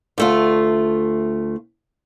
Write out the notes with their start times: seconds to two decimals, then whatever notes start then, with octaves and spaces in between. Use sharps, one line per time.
0.18 D2 A3 F4